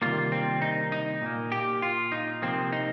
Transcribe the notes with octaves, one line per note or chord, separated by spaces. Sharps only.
C3 D#3 G3 A#3 F4
C4
D#4
D#4
A#2 A#3
G4
F4
D#4
C3 F3 A#3 C4
D#4